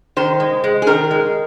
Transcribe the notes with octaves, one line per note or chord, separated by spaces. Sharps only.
D#3 C5
G#3
G#3
G#4
D#3 A#4
G#3